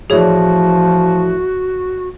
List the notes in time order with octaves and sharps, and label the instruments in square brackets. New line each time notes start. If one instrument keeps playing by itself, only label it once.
[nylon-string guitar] A2 E3 D5 [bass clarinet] F3 [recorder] F#4 [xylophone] G#4 C#5